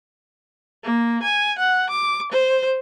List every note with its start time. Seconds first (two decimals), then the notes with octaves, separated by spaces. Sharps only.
0.83 A#3
1.22 G#5
1.58 F#5
1.90 D6
2.32 C5